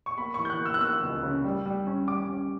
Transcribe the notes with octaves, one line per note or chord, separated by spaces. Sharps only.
C#6
A#3 B5
E3 C#6
G6
F#6
A#3
E6
F#6
A#3 E6
C#2
C#3
G3
G3
C#4
G3 D6
C#4